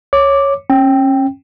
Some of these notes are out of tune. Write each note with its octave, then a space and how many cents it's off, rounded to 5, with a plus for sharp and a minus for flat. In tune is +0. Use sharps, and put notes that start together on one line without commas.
C#5 +0 D6 +0
C#4 -30 G5 +0